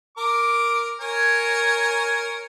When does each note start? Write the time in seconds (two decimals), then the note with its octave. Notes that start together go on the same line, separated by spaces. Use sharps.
0.17 A#4 D6
1.01 A#4 C#5 G#5